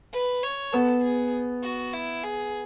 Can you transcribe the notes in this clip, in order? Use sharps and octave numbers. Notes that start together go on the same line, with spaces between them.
B4
C#5
B3 A4
G#4
F#4
E4
G#4